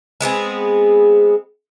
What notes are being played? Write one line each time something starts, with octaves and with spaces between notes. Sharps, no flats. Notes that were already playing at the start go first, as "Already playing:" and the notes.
G#3 B3 C4 G#4